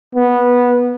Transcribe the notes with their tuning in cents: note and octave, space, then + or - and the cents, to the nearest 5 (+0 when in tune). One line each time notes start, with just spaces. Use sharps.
B3 -10